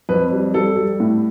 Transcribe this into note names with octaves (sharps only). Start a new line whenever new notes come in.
F2 B4
G3
G3 A4
G3
A2